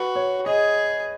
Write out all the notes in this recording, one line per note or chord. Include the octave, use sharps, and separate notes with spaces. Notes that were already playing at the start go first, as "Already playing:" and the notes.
Already playing: F#4 B4
C#5
G#4 D#5